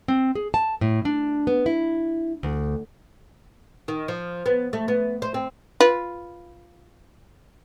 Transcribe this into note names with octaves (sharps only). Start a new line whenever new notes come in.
C4
G#4
A5
A2
D4
B3
E4
D2
D#3
F3
B3
A3
B3
C5
C4
F4 B4